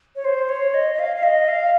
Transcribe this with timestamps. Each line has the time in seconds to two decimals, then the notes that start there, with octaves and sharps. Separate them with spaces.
0.16 C#5
0.25 C5
0.49 C#5
0.74 D#5
0.94 D#5
0.99 F5
1.16 F5
1.23 D#5
1.49 F5